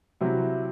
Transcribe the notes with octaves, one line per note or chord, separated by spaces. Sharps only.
C3 F#3 C4 E4